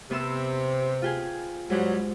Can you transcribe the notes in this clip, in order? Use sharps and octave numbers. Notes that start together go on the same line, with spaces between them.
C3 B3 C5 E6
F4 G4 G#4
G#2 F#3 G3